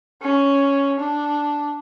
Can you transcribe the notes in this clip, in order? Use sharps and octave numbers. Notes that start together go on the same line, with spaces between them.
C#4
D4